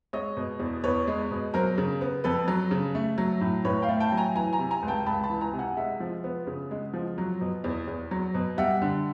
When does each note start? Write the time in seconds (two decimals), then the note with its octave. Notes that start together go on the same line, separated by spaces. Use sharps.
0.13 G#3 C#5 D#5
0.37 B2
0.60 E2
0.84 E2 B4 C#5
1.07 G#3
1.31 B2
1.54 F#3 A#4 C5
1.78 C#3
2.01 B3
2.24 F2 A4 B4
2.48 F#3
2.71 C#3
2.95 A3
3.18 F#3
3.41 A2
3.65 A2 B4 C#5
3.82 F5 G5
3.89 A3
4.00 G5 A5
4.12 F#3
4.17 G#5 A#5
4.35 E3 G#5 A#5
4.53 G#5 A#5
4.59 C3
4.71 G#5 A#5
4.82 C#2
4.88 G5 A5
5.06 C#2 A5 B5
5.23 A5 B5
5.30 E3
5.41 G#5 A#5
5.53 C3
5.59 F#5 G#5
5.77 G#3 E5 F#5
6.00 F3
6.24 B3
6.47 C#3
6.71 G#3
6.93 F3
7.18 F#3
7.41 B2
7.64 E2
7.87 E2
8.11 F#3
8.34 B2
8.58 G3 E5 F#5
8.82 D3